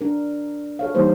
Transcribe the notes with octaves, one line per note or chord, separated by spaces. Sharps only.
D4 A#4
A4 C#5 F5
E3 G3 A#3 D#4 G4 C5